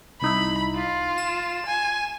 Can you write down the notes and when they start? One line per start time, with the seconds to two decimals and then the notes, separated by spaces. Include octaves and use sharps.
0.22 C2 D#4 E4 B5
0.76 F4
1.18 E7
1.67 G#5